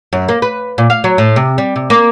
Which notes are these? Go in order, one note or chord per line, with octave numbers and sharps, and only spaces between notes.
F#2
A#3
B4
A#2
F5
F#3
A2
C3
G3
C3
A#3